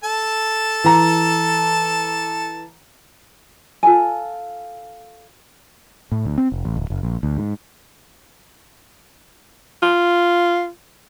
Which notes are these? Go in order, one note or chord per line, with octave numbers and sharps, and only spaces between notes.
A4 A5
E3 A#5
F4 A4 G#5
A2
D2
C4
F1
A1
D1
F#1
A#1
D2
G#2
F4